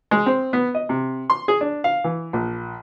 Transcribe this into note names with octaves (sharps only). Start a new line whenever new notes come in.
G#3
C4
B3
D#5
C3
C6
G#4
D4
F5
E3
A#1